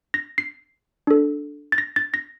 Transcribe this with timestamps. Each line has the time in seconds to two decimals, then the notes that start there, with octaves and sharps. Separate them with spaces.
0.14 A#6
0.38 C7
1.07 D4 A4
1.72 A6
1.78 A#6
1.96 A6
2.14 A#6